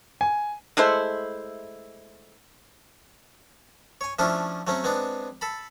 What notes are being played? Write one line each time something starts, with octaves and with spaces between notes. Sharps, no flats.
G#5
G#3 A3 E4 C5
C#5 G#5
F3 A3 C#4 D4 E4 F4
F#3 A3 C4 C#4
G#3 B3 C4 D4
A4 A5 B5